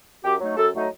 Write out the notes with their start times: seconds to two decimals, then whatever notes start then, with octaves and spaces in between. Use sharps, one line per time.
0.24 F#2 G4
0.40 F#3 A3 D#4
0.57 F#2 A4
0.74 F#3 A3 D#4